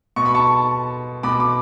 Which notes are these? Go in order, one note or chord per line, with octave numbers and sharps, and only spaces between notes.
B2 C#6
B5
A5 C#6
B2 B5 D6
D6